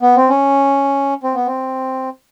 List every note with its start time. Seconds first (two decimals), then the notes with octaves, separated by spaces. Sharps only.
0.02 B3
0.16 C4
0.30 C#4
1.23 C4
1.35 B3
1.46 C4